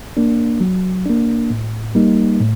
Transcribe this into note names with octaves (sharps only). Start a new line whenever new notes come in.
A#3 D4
F#3
A#3 D4
A2
G3 A#3 D#4
A2